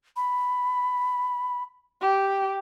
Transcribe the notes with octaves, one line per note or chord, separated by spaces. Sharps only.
B5
G4